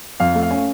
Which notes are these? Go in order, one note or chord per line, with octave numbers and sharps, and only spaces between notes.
F2 F5
A3
F5
C#4